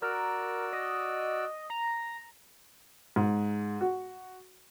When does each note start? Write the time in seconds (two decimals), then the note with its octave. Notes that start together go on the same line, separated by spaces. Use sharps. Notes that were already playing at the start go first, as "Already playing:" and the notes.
0.02 F#4 A#4 D5 E6
0.73 D#5
1.70 A#5
3.16 G#2
3.81 F#4